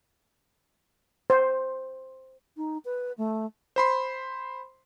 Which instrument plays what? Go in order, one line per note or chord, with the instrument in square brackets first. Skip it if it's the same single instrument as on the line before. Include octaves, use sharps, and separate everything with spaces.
[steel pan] C5
[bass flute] D#4
B4
A3
[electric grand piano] C5 B5 C6